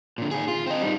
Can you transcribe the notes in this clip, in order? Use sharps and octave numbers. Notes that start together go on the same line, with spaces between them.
A#2 D3
D#3 G#4
F4
C4 D#5
G3 D#4